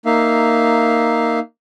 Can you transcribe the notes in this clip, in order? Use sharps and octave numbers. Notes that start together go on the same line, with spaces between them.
A#3 D#4 E5 F5